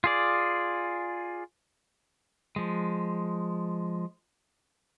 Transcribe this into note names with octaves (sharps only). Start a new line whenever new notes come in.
F4 G#4 D5
F3 G#3